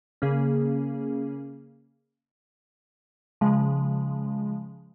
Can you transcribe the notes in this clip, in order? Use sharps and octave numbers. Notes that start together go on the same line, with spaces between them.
C#3 A#3 C#4 G#4
C#3 F3 G#3